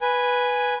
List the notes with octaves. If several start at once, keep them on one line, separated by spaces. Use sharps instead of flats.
B4 G#5